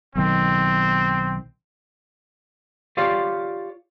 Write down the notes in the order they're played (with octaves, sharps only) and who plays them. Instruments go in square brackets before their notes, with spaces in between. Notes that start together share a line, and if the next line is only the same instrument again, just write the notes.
[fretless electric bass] B1 D#3 [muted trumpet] C4
[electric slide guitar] F4 G4 C#5 D5 F5